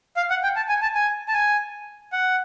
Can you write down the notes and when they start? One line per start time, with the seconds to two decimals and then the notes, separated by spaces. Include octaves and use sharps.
0.17 F5
0.30 F#5
0.43 G5
0.56 A5
0.69 G#5
0.82 A5
0.95 G#5
1.28 A5
1.33 G#5
2.12 F#5